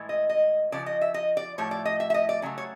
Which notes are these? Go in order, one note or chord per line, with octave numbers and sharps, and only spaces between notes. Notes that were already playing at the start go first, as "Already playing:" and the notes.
Already playing: A2 E3 G#3
D#5
D#5
C#3 F3 D5
D#5
E5
D#5
D5
A2 F3 A3 C#5
D5
D#5
E5
E5
D#5
D5
C#3 F#3 A3
C#5